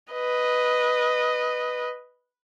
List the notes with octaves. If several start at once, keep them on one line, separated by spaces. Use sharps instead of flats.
B4 D#5